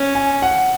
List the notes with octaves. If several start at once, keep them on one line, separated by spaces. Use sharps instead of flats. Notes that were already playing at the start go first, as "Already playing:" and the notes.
Already playing: C#4
G#5
F#5